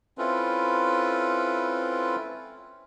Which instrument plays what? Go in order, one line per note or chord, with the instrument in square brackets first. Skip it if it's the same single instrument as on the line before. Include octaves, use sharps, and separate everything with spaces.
[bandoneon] C4 C#4 E4 F4 A4 B4